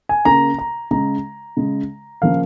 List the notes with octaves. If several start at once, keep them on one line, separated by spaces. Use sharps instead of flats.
G#5
C#3 A#3 A#5
A#5
C#3 G#3 A#5
C#3 G#3
C#3 F3 A#3 F5